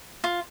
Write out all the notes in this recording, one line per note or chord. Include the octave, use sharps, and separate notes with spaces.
F4